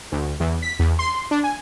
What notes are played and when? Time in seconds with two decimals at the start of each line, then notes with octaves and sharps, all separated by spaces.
0.12 D2
0.40 E2
0.62 B6
0.80 E2
0.99 C6
1.31 D4
1.44 G#5